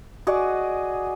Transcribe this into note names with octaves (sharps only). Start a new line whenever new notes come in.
F#4 G#4 D5 D#5